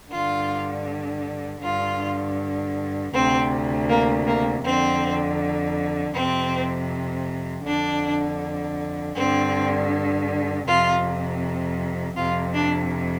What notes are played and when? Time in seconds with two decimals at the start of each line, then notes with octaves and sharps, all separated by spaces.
0.11 G2 D3 F4
1.62 G2 D3 F4
3.13 D2 C3 C4
3.89 A#3
4.26 A#3
4.63 F2 D3 C4
6.13 F2 C3 C4
7.64 F2 D3 D4
9.15 G2 D3 C4
10.66 F2 C3 F4
12.16 F2 C3 F4
12.54 D4